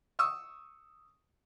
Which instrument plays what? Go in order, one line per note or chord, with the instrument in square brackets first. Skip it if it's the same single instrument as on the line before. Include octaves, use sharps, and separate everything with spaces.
[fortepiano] C#6 D#6 E6